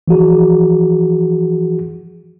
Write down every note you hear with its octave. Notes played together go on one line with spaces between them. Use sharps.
E3 F3 F#4 G#4